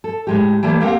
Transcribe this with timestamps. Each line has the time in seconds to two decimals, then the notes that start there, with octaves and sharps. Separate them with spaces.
0.04 A4
0.27 A2 G#3 G4
0.63 E3 G3 A3 A#3
0.81 A#3 C4 G4 A#4 F5 F#5